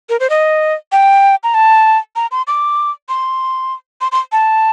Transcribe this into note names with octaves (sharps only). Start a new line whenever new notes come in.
A#4
C5
D#5
G5
A#5
A5
A#5
C6
D6
C6
C6
C6
A5